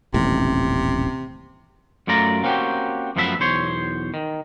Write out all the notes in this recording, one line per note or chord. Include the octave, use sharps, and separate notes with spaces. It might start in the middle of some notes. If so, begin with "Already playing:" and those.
D#1 A1 C3
F#2 A3 F4 D5 A#5
A#3 C4 C#4 F#4 G4
F#2 F3 A3 B3 A4 E5
B1 E2 C5 C#5
D#3